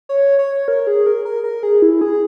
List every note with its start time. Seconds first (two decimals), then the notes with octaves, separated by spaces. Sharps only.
0.09 C#5
0.39 C#5
0.68 A#4
0.87 G#4
1.06 A#4
1.25 A#4
1.44 A#4
1.63 G#4
1.82 E4
2.01 G#4